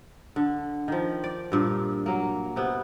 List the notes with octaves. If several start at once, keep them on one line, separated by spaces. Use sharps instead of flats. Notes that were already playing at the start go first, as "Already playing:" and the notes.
D3
D#3 F3
D5
G2 A#2
F#3 A#3
C3 B3